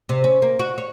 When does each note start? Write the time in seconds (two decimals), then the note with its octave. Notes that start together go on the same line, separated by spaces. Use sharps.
0.09 C3
0.24 C#4
0.42 A#3
0.59 F#4
0.78 C#5